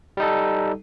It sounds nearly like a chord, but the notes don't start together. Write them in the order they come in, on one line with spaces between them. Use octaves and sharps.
G3 D#4 A4